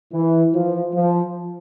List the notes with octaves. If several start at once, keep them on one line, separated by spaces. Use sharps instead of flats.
E3
F3
F3